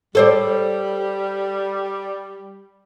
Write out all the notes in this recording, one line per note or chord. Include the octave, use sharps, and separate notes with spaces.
G3 A4 C5 D5